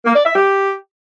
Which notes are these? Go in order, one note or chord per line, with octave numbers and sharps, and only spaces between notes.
A#3
D5
E5
G4